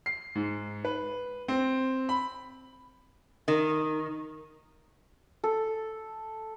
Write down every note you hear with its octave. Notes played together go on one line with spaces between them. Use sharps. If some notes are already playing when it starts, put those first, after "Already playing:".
C7
G#2
B4
C4
B5
D#3
A4